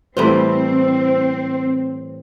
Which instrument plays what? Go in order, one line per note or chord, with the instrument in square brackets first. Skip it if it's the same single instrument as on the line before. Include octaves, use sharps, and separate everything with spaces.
[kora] A2 E3 G3 [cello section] C4 [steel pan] C5 B5